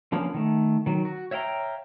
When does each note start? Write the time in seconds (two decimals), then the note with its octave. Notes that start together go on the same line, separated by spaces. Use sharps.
0.12 D3 F3 A#3 B3 C#4
0.34 D#3 A3
0.86 D#3 F#3
1.05 F#4
1.31 C#5 E5 F5 G5 A#5